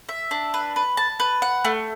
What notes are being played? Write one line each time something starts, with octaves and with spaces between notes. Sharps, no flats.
E5
D4
B4
B4
A5
B4
F#5
A3